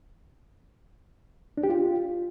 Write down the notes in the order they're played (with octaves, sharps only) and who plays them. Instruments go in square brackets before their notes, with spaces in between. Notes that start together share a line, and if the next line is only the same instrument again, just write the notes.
[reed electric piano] D4
G4
F4